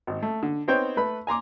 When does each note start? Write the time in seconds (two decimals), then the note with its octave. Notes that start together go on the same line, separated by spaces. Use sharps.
0.07 G#1
0.23 A3
0.43 D3
0.68 B3 C4 D#4 C5 C#5 G5
0.97 A3 B4 B5
1.27 G#5 A#5 C6 D6